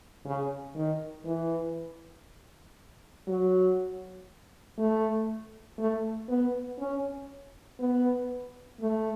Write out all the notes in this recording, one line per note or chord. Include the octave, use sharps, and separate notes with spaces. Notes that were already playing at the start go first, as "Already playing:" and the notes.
C#3
D#3
E3
F#3
A3
A3
B3
C#4
B3
A3